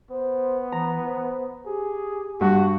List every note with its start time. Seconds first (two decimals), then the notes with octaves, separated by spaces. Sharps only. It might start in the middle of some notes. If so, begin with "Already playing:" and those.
0.10 B3 C5
0.72 E3 A#5
1.05 C5
1.66 G4 G#4
2.41 G2 F#4